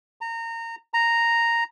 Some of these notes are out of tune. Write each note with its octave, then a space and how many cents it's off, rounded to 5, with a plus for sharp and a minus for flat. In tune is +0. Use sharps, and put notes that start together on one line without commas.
A#5 -25
A#5 -5